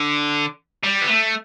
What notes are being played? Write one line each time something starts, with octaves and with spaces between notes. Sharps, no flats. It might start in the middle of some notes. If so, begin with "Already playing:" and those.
Already playing: D3
G3
B3
A3